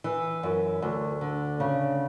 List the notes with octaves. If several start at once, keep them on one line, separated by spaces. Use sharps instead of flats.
E3
F#2
D2
D3
C#3